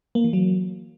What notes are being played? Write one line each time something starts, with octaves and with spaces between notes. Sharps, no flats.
A#3
E3
F#3